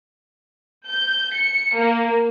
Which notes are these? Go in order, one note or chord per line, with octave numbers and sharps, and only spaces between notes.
G6
C#7
A#3